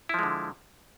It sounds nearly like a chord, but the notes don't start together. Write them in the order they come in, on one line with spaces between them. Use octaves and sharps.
E4 F3 G#3 D3